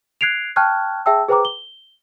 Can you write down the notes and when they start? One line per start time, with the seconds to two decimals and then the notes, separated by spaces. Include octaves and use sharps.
0.21 F#6 G#6 C7 D7 F7
0.56 G5 A5 C#6 F6 F#6 G#6
1.06 G#4 E5 G5 A5 E6
1.28 G#4 B4 C5 G5 A#5 D6
1.45 G7